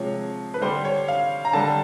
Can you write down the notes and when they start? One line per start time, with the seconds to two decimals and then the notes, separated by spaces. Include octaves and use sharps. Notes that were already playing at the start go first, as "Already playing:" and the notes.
Already playing: C3 F3 G#3 C#5
0.54 B4
0.61 D3 G3 C5
0.85 C#5
1.08 F5
1.45 A#5
1.53 D3 G3 A5